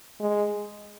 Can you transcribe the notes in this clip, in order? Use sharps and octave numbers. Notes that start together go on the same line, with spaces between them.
G#3